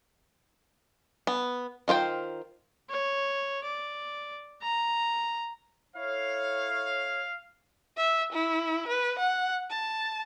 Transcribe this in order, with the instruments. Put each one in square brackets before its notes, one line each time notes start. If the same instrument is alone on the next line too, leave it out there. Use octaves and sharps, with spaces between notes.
[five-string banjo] B3
D#3 F4 C5 G5
[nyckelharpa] C#5
D5
A#5
[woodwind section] E4 A4 C#5 [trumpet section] F5
[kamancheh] E5
E4
B4
F#5
A5